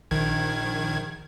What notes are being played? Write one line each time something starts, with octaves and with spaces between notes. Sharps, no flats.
A#1 D#3 G#6